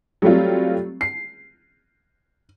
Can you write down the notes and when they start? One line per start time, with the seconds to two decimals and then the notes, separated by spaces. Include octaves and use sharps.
0.22 F#3 G3 A3 C4 F4
1.01 C7